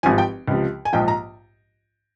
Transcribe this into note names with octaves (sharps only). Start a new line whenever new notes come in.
G#1 G2 F3 G#5
G5
C#2 C3 F3
G#5
A#1 G#2 F3 G5
A#5